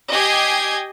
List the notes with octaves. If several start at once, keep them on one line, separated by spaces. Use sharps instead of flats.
G4 D#5 G5 G#5 G#6 C7